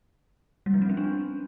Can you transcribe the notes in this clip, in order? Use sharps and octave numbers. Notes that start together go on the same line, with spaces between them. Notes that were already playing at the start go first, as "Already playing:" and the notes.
G3
F3
C4
C#4
D4